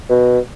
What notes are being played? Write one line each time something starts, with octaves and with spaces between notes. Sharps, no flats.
B2